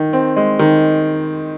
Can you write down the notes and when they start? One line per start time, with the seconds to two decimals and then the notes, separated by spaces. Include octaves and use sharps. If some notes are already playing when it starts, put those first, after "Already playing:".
Already playing: D#3
0.13 C4
0.36 G#3
0.59 D#3